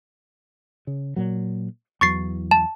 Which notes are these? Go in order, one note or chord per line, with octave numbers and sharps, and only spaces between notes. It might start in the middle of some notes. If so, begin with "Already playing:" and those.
C#3
A#2 F#3
E2 E3 F#3 C#6 A6 C7
A5